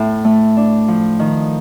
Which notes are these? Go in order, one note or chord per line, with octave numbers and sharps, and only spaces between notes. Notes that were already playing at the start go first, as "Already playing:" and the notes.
Already playing: A2
A3
D4
F3
D#3